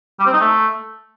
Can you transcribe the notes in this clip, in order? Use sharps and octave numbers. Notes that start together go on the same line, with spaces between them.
G3
C4
D#4
A3